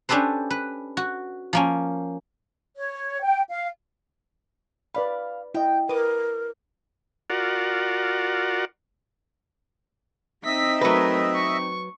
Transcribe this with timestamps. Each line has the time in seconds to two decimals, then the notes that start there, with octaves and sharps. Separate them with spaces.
0.09 C#4 D4 G4 A4 B4 C5
0.50 B4
0.97 F#4
1.53 F3 A#3 C#4
2.76 C#5
3.22 G5
3.48 F5
4.95 B4 D5 F5 B5
5.54 E4 D#5 G5
5.89 A#4 B4 D6 D#6
7.30 F4 F#4 A#4 D5 F#5
10.45 C4 D#4 D#5 E5 B6
10.81 F#3 A3 A#4 B4
11.35 C#6